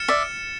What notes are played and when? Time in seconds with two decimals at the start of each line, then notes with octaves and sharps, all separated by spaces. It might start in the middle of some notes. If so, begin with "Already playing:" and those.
Already playing: F6 A6 C#7 E7
0.08 D5 E5